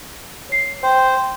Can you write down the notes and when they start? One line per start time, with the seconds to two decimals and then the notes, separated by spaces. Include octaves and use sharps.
0.49 C#5 C7
0.83 C5 G5